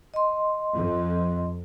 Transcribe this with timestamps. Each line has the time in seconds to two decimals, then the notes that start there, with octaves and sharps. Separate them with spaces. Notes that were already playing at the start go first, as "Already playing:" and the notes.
0.14 D#5 C6
0.75 F2